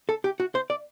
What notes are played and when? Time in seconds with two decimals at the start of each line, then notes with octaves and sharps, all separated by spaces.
0.09 A4
0.24 G4
0.40 F#4
0.55 C5
0.70 D5